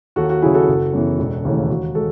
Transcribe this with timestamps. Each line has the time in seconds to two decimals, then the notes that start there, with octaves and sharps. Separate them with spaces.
0.16 D#2 F#4 A4
0.30 F#4
0.42 C#3 F#3 E4 G#4
0.54 F#4 A4
0.68 F#1
0.93 F#2 E3 B3
1.19 E1
1.45 D#2 C#3 E3 A3
1.69 D#2 F#4
1.95 G#3 F#4 A4